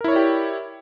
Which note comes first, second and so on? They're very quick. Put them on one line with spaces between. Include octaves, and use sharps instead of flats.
A#4 E4 C#5 D5 G4